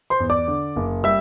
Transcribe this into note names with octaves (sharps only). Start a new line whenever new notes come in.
C5 C6
E2
D5 D6
D3
F#1
G3 E5 E6